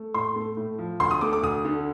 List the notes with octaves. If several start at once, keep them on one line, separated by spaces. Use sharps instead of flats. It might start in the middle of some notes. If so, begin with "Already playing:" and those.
Already playing: A3
A2 C6
A3
A2
F3
D2 C6
D#6
A3 D6
D6
D2 D#6
D3